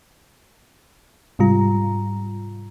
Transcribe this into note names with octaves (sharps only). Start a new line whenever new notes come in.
G#2 C3 G3 F4 A#5